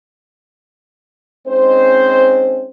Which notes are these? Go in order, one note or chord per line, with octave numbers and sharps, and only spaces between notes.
G#3 C4 C#4 D#4 C5